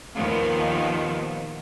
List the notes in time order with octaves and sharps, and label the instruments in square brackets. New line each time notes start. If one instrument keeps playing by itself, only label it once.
[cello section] D#2 A#2 D#3 F3 B3